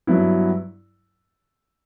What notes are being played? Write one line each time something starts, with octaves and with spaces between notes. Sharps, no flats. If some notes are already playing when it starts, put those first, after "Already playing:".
G2 F#3 B3 E4